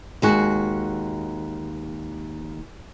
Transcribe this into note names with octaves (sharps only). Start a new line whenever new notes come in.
D#2 G#3 F#4